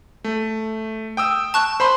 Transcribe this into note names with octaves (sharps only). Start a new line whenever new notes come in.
A3
G5 D#6 E6
A5 C#6 F#6
C5 B5 C6